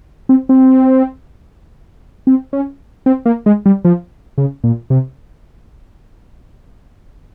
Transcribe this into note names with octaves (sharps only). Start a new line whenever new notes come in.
C4
C4
C4
C#4
C4
A#3
G#3
G3
F3
C#3
A#2
C3